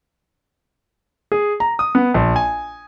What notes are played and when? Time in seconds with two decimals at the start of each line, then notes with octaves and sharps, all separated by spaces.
1.32 G#4
1.60 A#5
1.79 D#6
1.95 B3
2.14 A#1
2.36 G#5